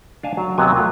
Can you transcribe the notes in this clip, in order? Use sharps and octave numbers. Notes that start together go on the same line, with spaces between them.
D4 F5 G#5 A5
F#3
D#2 C3 F#3 B3 G#5
A3 F4